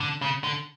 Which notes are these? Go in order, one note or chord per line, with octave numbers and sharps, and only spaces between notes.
D3
C#3
D3